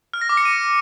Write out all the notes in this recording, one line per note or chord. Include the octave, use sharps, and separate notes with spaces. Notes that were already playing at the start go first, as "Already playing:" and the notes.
F6
A#6
D6
C#7
D#7